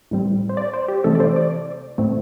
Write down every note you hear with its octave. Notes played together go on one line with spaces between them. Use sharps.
A2 G3 C4
C5
D5
C5
G4
C3 E3 A3 C4 A4
D5
C5
D5
A2 A3 C4